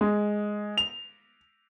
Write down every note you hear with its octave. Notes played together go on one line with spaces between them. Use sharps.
G#3
F7